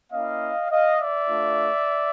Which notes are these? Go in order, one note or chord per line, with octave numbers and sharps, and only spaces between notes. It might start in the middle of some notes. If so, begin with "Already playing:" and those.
A#3 C#4 E4 D#5 F5
D#5 F5
D5 E5
A3 D4 F4